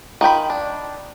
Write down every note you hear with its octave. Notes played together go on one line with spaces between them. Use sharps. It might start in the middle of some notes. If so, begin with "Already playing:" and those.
D#3 F4 G5 B5
D4